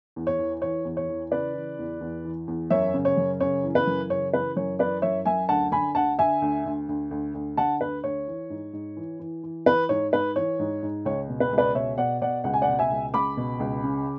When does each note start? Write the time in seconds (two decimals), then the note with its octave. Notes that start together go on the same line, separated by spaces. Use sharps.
0.16 E2
0.27 C#5
0.39 E3
0.62 E3 C#5
0.85 E2
0.97 C#5
1.09 E3
1.32 C#3 B4 D5
1.54 E3
1.79 E2
2.01 E2
2.25 E3
2.48 E2
2.70 F#2 C#5 E5
2.94 C#3
3.05 C#5
3.17 F#2
3.40 C#3 C#5
3.64 E3
3.75 B4
3.87 F#2
4.09 C#3 C#5
4.33 E3 B4
4.56 F#2 C#5
4.79 E3 B4 D5
5.02 F#2 C#5 E5
5.26 F#2 E5 G#5
5.49 D2 F#5 A5
5.72 D3 G#5 B5
5.95 D2 F#5 A5
6.19 D3 E5 G#5
6.42 D2
6.66 D2
6.89 D2
7.11 D2
7.34 D2
7.57 D3 F#5 A5
7.81 D2 B4
8.04 D2 C#5
8.27 E3
8.50 G#2
8.73 G#2
8.97 E3
9.20 E3
9.43 E3
9.66 E3 B4
9.89 G#2 C#5
10.13 G#2 B4
10.36 E3 C#5
10.59 G#2
10.83 G#2
11.05 C#2 C#5
11.29 B2
11.40 B4
11.52 C#2
11.58 B4 D5
11.75 B2 C#5 E5
11.98 B2 D5 F#5
12.22 B2 D5 F#5
12.44 C#2 F#5
12.54 G#5
12.62 D5 F#5
12.68 B2
12.79 E5 G#5
12.91 C#2
13.14 C#2 B5 D6
13.37 B2
13.60 C#2
13.84 C#3